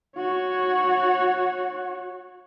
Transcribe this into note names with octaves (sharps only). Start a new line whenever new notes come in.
F#4 C#5